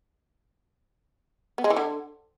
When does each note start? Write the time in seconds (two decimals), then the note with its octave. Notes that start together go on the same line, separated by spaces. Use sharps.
1.58 B3
1.64 G#3
1.70 E3
1.77 D3